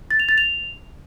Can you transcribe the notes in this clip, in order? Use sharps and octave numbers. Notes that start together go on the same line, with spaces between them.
A6
F7
A6
F7